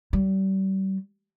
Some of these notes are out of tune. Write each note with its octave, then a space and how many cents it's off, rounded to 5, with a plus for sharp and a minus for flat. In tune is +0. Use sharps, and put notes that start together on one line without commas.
G3 -35